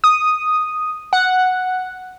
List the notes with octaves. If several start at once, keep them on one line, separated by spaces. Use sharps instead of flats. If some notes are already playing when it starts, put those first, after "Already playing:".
D#6
F#5